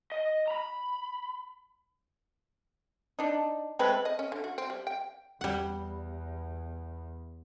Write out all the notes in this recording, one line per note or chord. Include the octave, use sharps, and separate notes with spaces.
D#5
A#5 B5
D4 D#4
G#3 A3 C4 B4
D#5
C#4
D3
F#4
C4
G3
G5
E2 G3 F#5